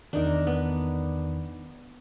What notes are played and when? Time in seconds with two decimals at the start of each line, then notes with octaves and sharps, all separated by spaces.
0.13 E2 D#3 D4 D#4 A#4
0.47 B3